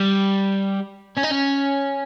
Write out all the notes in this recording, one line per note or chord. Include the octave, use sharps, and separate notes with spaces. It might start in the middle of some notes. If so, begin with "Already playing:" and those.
Already playing: G3
C#4
D#4
C#4